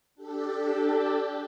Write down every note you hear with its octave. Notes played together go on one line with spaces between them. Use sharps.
D4 G4 A4